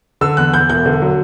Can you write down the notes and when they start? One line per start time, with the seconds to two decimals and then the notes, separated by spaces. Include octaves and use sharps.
0.21 D3 E6
0.37 E2 F#6
0.53 E2 G6
0.69 E1 G6
0.86 D3
1.02 F#3